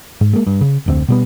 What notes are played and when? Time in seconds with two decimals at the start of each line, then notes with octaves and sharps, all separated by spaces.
0.21 G#2
0.33 G#3 A#3
0.47 G2
0.61 C#3
0.86 F1 D2 C4
1.08 B2 G3 B3